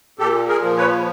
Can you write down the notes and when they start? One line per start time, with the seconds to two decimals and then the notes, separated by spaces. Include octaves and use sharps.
0.19 A#2 G4 A4
0.48 G#4 A#4
0.63 F3
0.77 B4 C#5